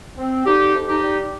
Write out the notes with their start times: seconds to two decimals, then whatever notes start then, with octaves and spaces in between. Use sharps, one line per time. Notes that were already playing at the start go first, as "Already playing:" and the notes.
0.18 C4
0.46 D3 D#4 G4
0.74 F2
0.89 D#4 G4
1.03 G3